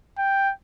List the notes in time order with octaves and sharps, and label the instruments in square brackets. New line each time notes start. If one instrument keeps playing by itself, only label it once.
[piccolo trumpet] G5